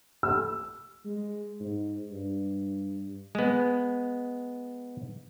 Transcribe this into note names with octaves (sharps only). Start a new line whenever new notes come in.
E6
G#3
G#2
G2
G#3 B3